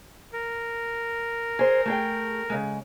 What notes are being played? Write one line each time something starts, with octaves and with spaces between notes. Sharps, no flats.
A#4
G#4 C5
A3 G#4 G5
C#3 G#3